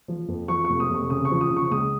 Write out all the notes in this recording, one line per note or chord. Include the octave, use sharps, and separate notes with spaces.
F3
F2
F3 C#6
F1 C#6
D#6
F1 C#6
C#3 D#6
C#6
F3
D#6
C#3
C#6
C#2 D#6